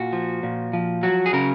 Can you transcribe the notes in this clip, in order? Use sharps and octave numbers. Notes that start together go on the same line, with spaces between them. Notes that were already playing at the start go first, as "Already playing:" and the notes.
Already playing: A#2 F#4
F3
A#2
F3
F#3 F#4
G#4
C#3 A#4